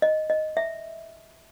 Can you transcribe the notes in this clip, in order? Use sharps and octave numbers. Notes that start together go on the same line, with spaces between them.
D#5
D#5
E5